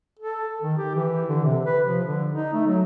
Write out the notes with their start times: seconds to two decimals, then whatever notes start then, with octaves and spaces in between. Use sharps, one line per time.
0.19 A4
0.61 D#3
0.78 G4
0.95 E3
1.29 D3
1.44 C3
1.65 B4
1.86 F3
2.04 D3
2.33 D#4
2.53 A3
2.67 F#3